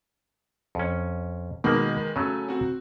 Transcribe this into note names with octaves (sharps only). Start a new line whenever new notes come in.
F2 C#4
B2 D#3 G#3 A#3 B3
C#3 F#3 A3 C#4
C4 F#4